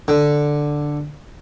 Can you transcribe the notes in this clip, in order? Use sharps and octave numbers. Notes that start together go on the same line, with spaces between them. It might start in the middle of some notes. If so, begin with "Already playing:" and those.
D3